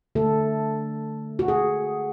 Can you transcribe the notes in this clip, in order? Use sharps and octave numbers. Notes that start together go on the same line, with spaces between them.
D3 A3 A4
F#4
G#4